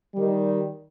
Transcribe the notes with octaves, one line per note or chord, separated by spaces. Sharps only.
D#3 G3